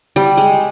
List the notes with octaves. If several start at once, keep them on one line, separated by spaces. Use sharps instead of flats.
G3
G#3